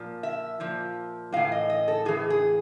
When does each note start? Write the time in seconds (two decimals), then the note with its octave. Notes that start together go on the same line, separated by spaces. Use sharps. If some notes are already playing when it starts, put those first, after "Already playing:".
Already playing: A#2 F3
0.23 E5
0.60 A#2 F3
1.33 A2 E3 F5
1.52 D#5
1.70 D#5
1.88 A4
2.05 A2 E3 G#4
2.30 G#4